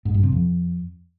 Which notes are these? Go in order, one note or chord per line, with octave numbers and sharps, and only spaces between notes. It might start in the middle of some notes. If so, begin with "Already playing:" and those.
G#2
G2
C3
F2